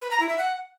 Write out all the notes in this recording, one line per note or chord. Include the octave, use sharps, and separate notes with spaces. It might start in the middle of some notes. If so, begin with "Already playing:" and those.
B4
A#5
E4
E5
F#5